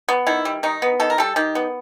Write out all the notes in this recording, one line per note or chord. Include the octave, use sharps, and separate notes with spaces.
B3
D#3 E4
G3
D#3 D#4
B3
D#3 A4
A#4
G3 A4
D#3 G4
B3